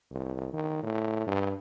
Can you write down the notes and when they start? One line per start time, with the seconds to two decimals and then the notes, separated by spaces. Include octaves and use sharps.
0.11 C2
0.53 D#3
0.83 A2
1.27 G2